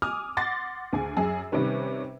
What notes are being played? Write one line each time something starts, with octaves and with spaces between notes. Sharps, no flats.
G#5 D6 D#6 F6
F#5 C6 D6 A6 A#6
D2 G#4 G#5
F#2 G#4 E6
C3 D#3 G3 C#4 B4